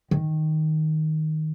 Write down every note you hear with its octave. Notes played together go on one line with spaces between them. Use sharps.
D#3